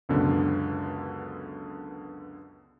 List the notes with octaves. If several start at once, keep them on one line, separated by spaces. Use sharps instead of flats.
C#2 F#2 B2 D3